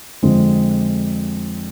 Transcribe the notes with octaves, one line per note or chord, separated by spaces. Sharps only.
F2 D3 F3 G#3 C4